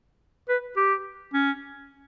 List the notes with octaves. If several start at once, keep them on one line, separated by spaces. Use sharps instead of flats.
B4
G4
C#4